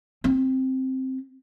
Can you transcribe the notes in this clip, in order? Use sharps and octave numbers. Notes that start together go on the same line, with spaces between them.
C4